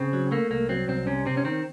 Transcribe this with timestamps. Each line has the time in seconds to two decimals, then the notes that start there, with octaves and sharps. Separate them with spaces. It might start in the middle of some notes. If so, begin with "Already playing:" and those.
Already playing: C#3 C4
0.13 F#3
0.32 A3 A#3
0.50 C2 A#3
0.69 F#3 C4
0.88 C2 C4
1.07 C3 C#4
1.26 C3 C4
1.37 C#4
1.44 D#3 C4